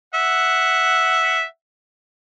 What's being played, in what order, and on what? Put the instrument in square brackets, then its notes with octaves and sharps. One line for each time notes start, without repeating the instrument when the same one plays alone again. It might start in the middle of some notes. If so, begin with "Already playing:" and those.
[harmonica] E5 F#5